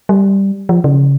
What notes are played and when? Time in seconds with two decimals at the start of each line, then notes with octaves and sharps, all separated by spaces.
0.09 G3
0.69 F3
0.84 C#3